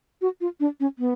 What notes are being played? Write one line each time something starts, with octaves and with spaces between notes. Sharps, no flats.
F#4
F4
D4
C#4
B3